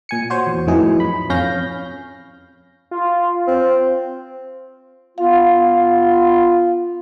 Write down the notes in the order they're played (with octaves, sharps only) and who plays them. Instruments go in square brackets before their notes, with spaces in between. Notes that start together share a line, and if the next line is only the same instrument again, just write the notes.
[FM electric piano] A#2 G#5 C#7
F#4 C5 C#5
E2
F2 A2 E3 F#3 D#4 G#4
B5
F2 C#4 F5 G6 A#6
[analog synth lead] F4
[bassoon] C4
[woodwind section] B3 F4 [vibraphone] F5